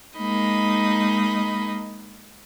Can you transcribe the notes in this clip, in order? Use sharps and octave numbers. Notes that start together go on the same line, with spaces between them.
G#3 A#3 D#4 D#5 B5